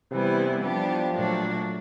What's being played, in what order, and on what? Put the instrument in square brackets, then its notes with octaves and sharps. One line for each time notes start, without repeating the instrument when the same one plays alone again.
[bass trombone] C3 [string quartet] E3 G3 B3 E4
[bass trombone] F3 [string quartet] G3 B3 D4 G4
[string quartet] A#2 F#3 A3 D4 F#4